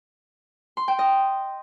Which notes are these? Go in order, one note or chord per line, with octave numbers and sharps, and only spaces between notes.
C6
G5
D#5